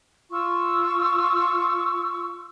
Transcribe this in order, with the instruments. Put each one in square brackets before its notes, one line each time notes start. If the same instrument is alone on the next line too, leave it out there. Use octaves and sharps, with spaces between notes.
[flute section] F4 C#6 E6